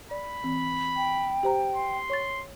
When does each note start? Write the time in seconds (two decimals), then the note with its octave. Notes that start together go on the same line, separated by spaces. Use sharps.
0.11 D5 B5
0.44 E3 C4
0.96 G5
1.43 G4 C5 A#5
1.76 C6
2.10 C#5 C#6 A6